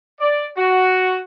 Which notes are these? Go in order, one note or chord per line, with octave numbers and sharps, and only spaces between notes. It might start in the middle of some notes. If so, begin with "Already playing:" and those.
D5
F#4